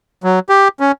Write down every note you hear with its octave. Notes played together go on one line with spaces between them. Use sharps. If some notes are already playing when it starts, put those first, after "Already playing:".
F#3
G4
C#4